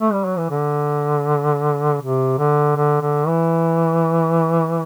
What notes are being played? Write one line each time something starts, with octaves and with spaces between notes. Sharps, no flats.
A3
G3
F#3
E3
D3
C3
D3
D3
D3
E3